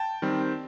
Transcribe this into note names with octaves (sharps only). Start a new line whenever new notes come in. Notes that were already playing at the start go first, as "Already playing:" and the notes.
Already playing: G5 A5
D#3 G3 C4